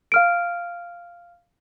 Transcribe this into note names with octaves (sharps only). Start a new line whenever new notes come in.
F5 F6 D7